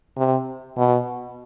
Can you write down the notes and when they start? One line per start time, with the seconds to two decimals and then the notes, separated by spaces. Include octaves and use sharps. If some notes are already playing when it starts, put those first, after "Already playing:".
0.17 C3
0.77 B2